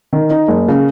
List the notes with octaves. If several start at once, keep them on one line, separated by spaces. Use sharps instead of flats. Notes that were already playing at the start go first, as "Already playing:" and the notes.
D#3
D#4
F#1
C#3